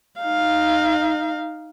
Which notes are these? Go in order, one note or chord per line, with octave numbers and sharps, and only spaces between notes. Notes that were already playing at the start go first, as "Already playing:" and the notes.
D#4 F5